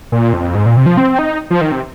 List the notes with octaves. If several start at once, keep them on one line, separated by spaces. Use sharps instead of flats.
A#2
F2
G#2
A#2
C3
F3
C4
D#4
F3
D#3
C3